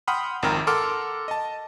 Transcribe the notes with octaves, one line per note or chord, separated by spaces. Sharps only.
F#5 G5 B5 C6 D#6 F6
G#1 F2 D#3 G5 A#5 F6
A4 A#4 F#5 C6 D6 F6
D#5 A5